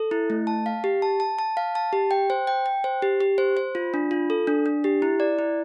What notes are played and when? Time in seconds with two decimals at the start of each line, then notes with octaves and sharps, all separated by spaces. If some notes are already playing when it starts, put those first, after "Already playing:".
Already playing: A4
0.11 E4
0.30 A3
0.47 A5
0.66 F5
0.84 G4
1.02 A5
1.20 A5
1.39 A5
1.57 F5
1.75 A5
1.93 G4
2.11 G5
2.30 C5
2.47 G5
2.66 G5
2.84 C5
3.02 G4
3.21 G4
3.38 C5
3.57 C5
3.75 F4
3.94 D4
4.11 F4
4.30 A4
4.47 D4
4.66 D4
4.84 G4
5.02 E4
5.20 D5
5.39 E4